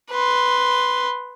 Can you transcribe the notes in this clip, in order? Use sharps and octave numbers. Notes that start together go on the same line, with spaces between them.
B4 C6